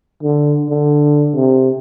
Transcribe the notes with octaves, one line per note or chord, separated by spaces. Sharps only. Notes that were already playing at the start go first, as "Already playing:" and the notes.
D3
D3
C3